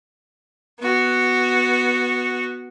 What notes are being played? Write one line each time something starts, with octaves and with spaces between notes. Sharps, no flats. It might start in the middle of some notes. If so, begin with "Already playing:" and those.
B3 F#4